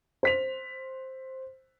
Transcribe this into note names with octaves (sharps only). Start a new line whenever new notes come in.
C5 B6 F7